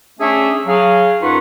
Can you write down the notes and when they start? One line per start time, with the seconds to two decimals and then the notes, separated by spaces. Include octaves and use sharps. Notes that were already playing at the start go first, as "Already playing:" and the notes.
0.19 A3 C#4 D4 G#4 C#5 E5
0.66 F#3 G#4 F5
1.22 F#2 D#4 F4 B4 F#5 C#6